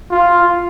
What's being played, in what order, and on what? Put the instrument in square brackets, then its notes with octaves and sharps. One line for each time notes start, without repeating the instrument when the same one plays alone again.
[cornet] F4